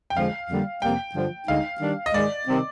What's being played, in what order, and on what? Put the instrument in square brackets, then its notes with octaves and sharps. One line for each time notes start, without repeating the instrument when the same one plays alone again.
[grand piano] G5
[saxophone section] F2 D3 F3 G#3 [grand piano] F5
[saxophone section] F2 D3 G3 A#3
[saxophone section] F2 C3 G3 A#3 [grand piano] G5
[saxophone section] G2 D3 F3
[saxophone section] D2 D3 G#3 D#4 [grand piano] F5
[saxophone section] D#3 G3 D4
[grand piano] D#5
[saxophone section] G#2 D#3 G#3 [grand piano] D5
[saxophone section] C3 D#3 G3 C4